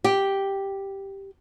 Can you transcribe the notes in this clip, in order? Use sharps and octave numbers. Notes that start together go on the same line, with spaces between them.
G4